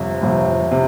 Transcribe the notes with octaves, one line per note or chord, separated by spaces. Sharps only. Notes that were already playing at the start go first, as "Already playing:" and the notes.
Already playing: G1 F2 C3
G1 F2 C3
C3